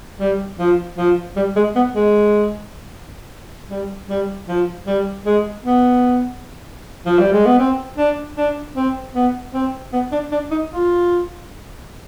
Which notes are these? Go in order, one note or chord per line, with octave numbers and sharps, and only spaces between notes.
G3
F3
F3
G3
G#3
B3
G#3
G3
G3
F3
G3
G#3
B3
F3
G3
G#3
B3
C4
D4
D4
C4
B3
C4
B3
D4
D4
D#4
F4